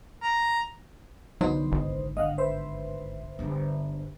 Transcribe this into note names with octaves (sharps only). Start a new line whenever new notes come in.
A#5
C2 D3 F#3 B3 D#4 C5
G#1
G1 D#5 F5 F#5
B4 C5 E5
G1 D3